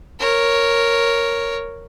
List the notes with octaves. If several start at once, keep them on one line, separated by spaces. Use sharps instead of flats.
A#4 C#5